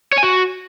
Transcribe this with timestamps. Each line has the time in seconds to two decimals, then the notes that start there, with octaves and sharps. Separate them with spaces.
0.12 C#5
0.18 G#5
0.23 F#4